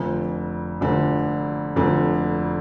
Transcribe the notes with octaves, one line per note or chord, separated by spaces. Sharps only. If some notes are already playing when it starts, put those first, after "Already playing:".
Already playing: F1 F2 D3
F1 F2 D3
F1 F2 D3